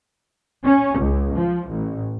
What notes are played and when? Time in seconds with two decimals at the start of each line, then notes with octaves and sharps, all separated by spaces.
0.64 C#4
0.97 C#2
1.36 F3
1.69 A1